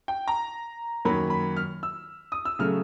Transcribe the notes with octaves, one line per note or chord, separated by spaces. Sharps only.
G5
A#5
F#2 D#3 F#3 A#3 B5
B5
F6
E6
D#6
E6
C#3 F#3 A3 F6